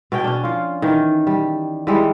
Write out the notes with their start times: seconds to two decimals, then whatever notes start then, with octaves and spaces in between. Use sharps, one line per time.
0.12 B2 C#4 G5
0.24 C#4 D4
0.44 F3 F4
0.82 D#3 E3
1.27 G3
1.87 E3 G3 G#3